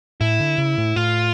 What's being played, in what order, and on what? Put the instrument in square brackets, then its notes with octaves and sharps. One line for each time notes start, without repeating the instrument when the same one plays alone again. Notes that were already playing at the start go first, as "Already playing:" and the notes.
[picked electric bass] A2 [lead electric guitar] E4
[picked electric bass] D3
C#3
A2
[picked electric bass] A2 [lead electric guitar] F4